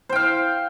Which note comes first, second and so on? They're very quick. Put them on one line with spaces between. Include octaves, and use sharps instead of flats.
C5 G5 F5